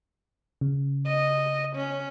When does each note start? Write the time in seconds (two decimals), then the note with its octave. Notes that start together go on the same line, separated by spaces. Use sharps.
0.61 C#3
1.06 D#5
1.76 C#4